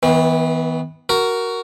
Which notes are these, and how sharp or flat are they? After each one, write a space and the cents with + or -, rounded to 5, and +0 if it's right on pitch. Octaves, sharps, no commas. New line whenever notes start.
E3 -45 B3 +0
F#4 +10 A#4 +0